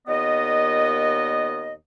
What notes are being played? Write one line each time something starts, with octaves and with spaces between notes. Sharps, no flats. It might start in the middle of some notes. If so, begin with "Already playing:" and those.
D#2 A#2 B3 D#5